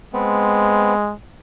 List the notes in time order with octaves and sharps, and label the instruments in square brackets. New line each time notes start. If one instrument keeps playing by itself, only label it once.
[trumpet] G#3 [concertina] B3 C4